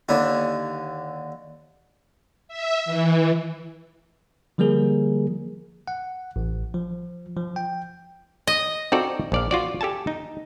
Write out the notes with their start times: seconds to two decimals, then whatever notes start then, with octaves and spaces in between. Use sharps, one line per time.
0.09 D#2 D3 E4
2.48 E5
2.85 E3
4.58 D3 F3 G3 A#3 G#4 A#4
5.88 F#5
6.36 A1
6.74 F3
7.36 F3
7.56 G5
8.47 D#5
8.92 C4 D#4 F4 F#4 A4 D5
9.32 A#1 D5 F5
9.51 F4 F#4 D5
9.81 G4 A4 G#5 A5
10.07 D#4